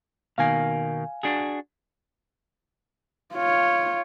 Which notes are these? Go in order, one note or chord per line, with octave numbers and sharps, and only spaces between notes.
B2 D#3 A#3 F5 G#5
D4 F#4 G#4
F4 C#5